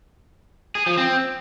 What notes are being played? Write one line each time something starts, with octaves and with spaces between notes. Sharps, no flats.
G#4
F3
C4